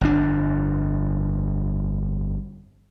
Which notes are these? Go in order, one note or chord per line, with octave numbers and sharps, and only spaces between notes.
G1 F2 D4